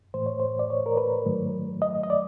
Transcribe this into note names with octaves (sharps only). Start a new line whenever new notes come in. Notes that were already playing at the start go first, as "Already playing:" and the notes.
A2 E3 A3 C5
C#5
C5
D5
C#5
A#4
B4
G#2 D#3 F#3 A3
D#5
D#5
D5